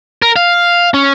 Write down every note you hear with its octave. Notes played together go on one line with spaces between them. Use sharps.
A#4
F5
C#4